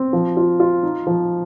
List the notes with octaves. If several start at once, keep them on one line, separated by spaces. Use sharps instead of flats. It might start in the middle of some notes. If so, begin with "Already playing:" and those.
Already playing: C4
F3
F4
F4
D#4
F3